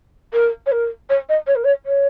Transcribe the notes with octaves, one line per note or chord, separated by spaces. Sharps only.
A#4
C#5
A#4
C#5
D#5
C#5
A#4
C#5
C#5